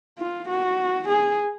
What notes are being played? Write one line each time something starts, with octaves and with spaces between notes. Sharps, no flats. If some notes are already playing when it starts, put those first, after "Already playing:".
F4
F#4
G#4